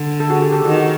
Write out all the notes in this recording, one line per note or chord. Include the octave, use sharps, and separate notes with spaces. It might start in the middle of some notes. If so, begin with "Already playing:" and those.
Already playing: D3
A4
F#4 G#4
G4 A4
G4 A4
D#3 F#4 G#4
F#4